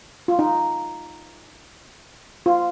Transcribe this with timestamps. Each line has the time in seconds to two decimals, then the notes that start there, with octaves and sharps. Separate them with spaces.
0.28 F4
0.39 D#4
2.46 F4